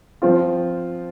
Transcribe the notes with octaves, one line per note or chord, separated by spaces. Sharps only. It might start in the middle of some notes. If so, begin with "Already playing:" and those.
F3 C4 F4